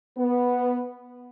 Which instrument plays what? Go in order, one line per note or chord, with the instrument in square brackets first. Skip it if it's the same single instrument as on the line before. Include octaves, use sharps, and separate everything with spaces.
[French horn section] B3